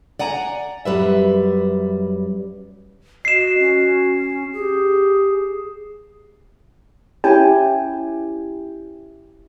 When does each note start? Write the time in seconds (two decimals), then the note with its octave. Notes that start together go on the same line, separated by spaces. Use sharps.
0.19 D5 F#5 G#5 A#5
0.85 F#2 G3 B4 E5
3.25 F#4 D#5 C7 E7
3.59 C#4
4.53 G4 G#4
7.24 C#4 E4 G4 G5 G#5